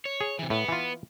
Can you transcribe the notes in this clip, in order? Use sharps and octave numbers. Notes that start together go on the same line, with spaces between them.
C#5
G#4
C3 E3
A2 B3
E3 F4